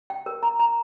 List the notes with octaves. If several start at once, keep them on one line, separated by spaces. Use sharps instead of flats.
G5
A#4
A#5
A#5